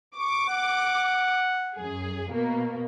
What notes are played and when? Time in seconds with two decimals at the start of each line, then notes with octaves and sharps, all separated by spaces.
0.17 C#6 D6
0.49 F#5
1.75 F#2 G#4
2.31 B2 A#3